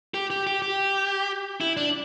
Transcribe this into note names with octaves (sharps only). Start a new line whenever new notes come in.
G4
G4
G4
G4
E4
D4